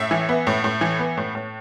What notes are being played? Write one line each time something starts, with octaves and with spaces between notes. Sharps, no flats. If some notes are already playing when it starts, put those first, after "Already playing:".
Already playing: A2 E5
E3
B3
A2
A2
E3
B3
A2
A2